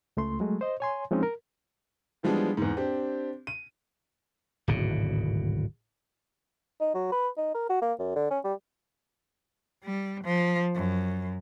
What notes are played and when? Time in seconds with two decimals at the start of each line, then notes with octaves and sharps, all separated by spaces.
0.17 C#2 A3 C6
0.40 F#3 G#3 A3
0.61 C5 D#5
0.80 C#5 G#5 C6
1.11 F3 G#3 C4 C#4 D#4
1.23 A#4
2.23 E3 F3 G3 G#3 B3 D4
2.57 E2 G#2
2.77 C4 D4 G4
3.47 D#7
4.68 D1 G#1 B2
6.81 D#4
6.95 F#3
7.12 B4
7.38 D#4
7.55 A#4
7.70 F#4
7.82 A#3
7.99 F#2
8.16 D3
8.31 C#4
8.44 G3
9.85 G3
10.24 F3
10.75 F#2